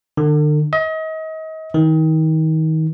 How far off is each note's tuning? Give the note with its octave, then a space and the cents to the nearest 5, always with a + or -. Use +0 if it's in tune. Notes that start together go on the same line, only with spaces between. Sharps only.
D3 +40
D#5 +35
D#3 +30